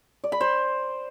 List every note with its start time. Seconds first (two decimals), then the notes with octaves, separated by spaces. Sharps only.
0.24 D5
0.32 B5
0.41 C5